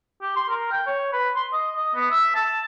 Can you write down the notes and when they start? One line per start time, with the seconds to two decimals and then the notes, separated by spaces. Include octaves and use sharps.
0.22 G4
0.36 C6
0.50 A#4
0.72 G5
0.86 C#5
1.13 B4
1.35 C6
1.53 D#5
1.76 D#5
1.95 B3
2.11 E5
2.35 A5